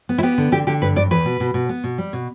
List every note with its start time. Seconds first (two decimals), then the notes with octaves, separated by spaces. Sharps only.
0.09 B3
0.18 E4
0.23 B3 G4
0.38 D3
0.52 D3 G4
0.67 D3 G4
0.81 G2 B4
0.96 G2 D5
1.11 E2 B4
1.25 B2
1.40 B2
1.54 B2
1.69 B3
1.84 B2
1.98 G3
2.13 B2